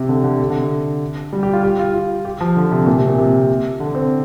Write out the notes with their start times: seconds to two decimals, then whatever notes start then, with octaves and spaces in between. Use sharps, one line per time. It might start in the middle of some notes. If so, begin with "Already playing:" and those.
Already playing: C3
0.09 D3
0.24 D3
0.40 C3
0.50 D3
1.33 G3
1.43 G4
1.53 F4
1.63 G4
1.79 F4
1.94 F4
2.25 G4
2.41 F3
2.57 D3
2.72 C3
2.86 A#2
2.97 C3
3.08 A#2
3.18 C3
3.80 D3
3.95 C4